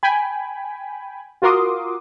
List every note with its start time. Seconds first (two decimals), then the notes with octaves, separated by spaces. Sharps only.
0.03 G5 G#5 B5
1.42 F4 F#4 A#4 C6 D6 D#6